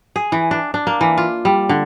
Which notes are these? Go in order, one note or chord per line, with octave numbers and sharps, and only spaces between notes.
G#4
E3
D4
D4
A#3
E3
F4
G3
D3